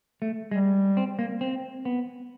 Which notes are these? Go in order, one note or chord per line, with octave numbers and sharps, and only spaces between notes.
A3
G3 G#3
C4
A#3
C4
B3